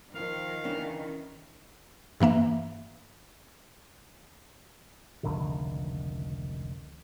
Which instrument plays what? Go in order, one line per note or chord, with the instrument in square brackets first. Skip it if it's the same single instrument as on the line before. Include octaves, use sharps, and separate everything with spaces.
[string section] D#3 [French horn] F3 [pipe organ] F5
[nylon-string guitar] C#3 C#4 D4 [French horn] E3
[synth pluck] G2 E3 A#3 E5
[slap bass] F1 C#2 D3 D#3